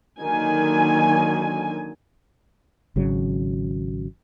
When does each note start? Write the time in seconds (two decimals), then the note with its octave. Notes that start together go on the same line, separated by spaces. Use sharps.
0.21 D3 D#3 F#3 A#3 G#5
2.96 G#1 C#3 F#3